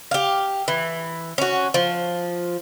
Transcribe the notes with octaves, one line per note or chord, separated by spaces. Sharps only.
G4 F5
E3
C#4 F#4
F3